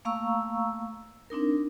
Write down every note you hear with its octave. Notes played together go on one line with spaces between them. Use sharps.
A3 A#3 F5 A#5 C#6 E6
C4 D4 D#4 A#4